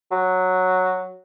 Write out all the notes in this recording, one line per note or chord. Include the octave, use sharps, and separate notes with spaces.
F#3